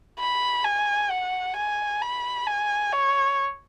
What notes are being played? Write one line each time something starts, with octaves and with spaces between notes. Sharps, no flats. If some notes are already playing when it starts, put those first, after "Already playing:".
B5
G#5
F#5
G#5
B5
G#5
C#5